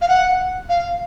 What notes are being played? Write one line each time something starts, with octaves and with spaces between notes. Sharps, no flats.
F5
F#5
F5